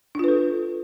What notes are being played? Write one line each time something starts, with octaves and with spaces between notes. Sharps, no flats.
D4 F4 A4 B4